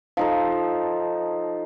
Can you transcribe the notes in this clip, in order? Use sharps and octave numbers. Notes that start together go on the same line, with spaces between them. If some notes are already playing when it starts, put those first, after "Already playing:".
F3 D#4 A4